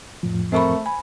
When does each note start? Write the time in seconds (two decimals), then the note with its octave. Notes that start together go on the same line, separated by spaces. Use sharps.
0.23 F2 A2 F3
0.52 A3 C4 A#4 C5 B5 C#6
0.86 G#5 B5